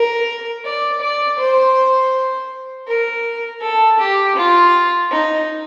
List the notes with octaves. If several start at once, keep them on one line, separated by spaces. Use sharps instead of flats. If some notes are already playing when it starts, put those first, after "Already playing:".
Already playing: A#4
D5
D5
C5
A#4
A4
G4
F4
D#4